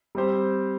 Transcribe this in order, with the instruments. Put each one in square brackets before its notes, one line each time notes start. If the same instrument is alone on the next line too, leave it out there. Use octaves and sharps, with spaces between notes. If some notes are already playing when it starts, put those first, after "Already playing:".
[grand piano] G3 C4 G4 C5